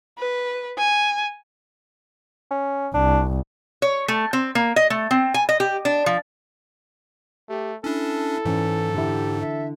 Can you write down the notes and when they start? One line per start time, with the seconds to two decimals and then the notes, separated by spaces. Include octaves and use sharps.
0.19 B4
0.78 G#5
2.51 C#4
2.94 C2 D4
3.82 C#5
4.08 A3
4.33 C4
4.55 A#3
4.76 D#5
4.90 A3
5.11 C4
5.34 G#5
5.49 D#5
5.60 G4
5.85 D4
6.06 F3
7.49 A3 G4
7.84 C#4 D4 E4 A4
8.45 G#2 E3 C#4
8.94 D3 E4 G4
9.40 E5